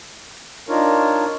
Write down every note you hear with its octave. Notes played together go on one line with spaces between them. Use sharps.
D4 D#4 F4 A#4 C#5